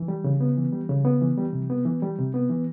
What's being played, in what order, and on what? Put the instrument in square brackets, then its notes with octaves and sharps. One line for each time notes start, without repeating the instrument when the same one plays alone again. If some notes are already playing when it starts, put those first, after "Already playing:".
Already playing: [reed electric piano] E3
G3
C#3
B3
E3
G3
C#3
B3
E3
G3
C3
B3
E3
G3
C3
B3
E3